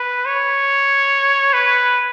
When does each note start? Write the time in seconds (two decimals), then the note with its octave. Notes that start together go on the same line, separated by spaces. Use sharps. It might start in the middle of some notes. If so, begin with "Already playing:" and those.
Already playing: B4
0.25 C#5
1.53 B4